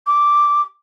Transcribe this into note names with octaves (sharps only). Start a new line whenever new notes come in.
D6